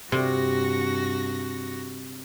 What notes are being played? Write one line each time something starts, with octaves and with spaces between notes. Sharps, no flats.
G2 C3 F#4 A#6